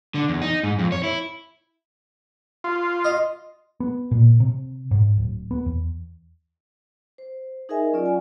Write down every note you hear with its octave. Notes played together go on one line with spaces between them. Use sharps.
D3
E2
D#4
G#2
F2
C#5
E4
F4
D#5
B3
A#2
C3
G#2
D1
B3
E2
C5
D#4 G#4 A#4 D#5 E5 G#5
F#3 C#4 F4 D5 F#5
G#5